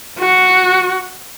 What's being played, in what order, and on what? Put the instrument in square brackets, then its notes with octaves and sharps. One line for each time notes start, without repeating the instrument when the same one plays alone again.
[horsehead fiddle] F#4